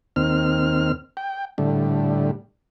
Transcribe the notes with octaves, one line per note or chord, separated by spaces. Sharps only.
D#2 C4 F6
G5
A2 D3 G3